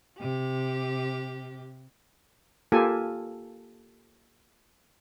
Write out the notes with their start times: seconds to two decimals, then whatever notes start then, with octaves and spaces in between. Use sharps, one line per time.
0.19 C3 G4
2.72 A#3 F4 G4 A4 G#5